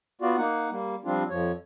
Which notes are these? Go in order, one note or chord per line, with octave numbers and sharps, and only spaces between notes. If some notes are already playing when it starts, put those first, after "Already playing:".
B3 F4 F#4 D5
A#3 D#4 F#5
G3 A#3
F3 G3 C4 D4 F4
F2 F3 C#5